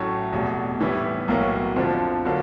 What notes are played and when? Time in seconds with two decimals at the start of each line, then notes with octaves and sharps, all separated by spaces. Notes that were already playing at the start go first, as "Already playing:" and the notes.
Already playing: A1 A2 F#3 A3 C#4
0.32 F1 E2 B2
0.80 A2 E3 G3 B3 E4
1.28 B1 A2 F#3 A#3
1.76 F2 D3 F3
2.25 D3 F#3 A#3